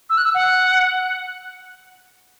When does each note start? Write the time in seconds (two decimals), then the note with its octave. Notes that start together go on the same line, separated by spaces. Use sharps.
0.10 E6
0.18 F#6
0.25 E6
0.35 F#5